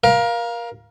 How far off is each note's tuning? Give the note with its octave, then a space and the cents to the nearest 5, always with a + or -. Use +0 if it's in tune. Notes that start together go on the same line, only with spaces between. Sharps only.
A#4 +25 F5 +0